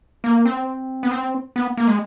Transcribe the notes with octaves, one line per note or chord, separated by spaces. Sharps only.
A#3
C4
B3
C4
B3
A#3
G#3